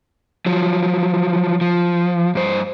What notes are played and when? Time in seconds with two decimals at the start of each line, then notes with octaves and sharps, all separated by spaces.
0.46 F3 F#3
1.61 F3
2.35 G2 C5